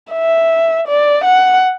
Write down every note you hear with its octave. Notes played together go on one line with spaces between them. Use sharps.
E5
D5
F#5